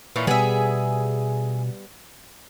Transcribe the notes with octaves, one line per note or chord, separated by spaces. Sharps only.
A#2 E3 C#4
B2 G3 B3 G#4 E5